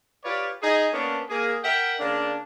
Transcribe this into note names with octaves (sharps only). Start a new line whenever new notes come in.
F4 G4 B4 C#5 D5
D#4 G#4
A#3 B3 C#4 D4
A#3 G#4
A#4 E5 F#5 G5
C#3 A#3 D4